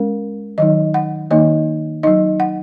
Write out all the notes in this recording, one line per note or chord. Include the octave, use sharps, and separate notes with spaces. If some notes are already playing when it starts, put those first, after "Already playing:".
Already playing: G#3 C#4 A#4
D#3 F#3 D#4 D#5
F#5
D#3 A#3 D#4 D#5
F#3 D#4 D#5
F#5